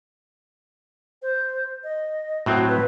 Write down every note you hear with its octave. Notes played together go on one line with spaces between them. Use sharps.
C5
D#5
A2 F#3 C4 F#4
B4